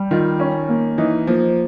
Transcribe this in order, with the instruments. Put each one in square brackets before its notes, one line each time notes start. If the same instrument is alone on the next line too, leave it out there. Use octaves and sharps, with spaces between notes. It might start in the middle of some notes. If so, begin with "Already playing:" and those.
Already playing: [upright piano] G3
[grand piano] D#3 [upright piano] F4
[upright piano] C#4
A#3
[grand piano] E3 [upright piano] D#4
[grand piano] F3 [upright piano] A#3